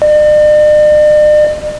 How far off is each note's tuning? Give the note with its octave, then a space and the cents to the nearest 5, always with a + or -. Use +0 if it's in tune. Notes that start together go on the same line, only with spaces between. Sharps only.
D5 +45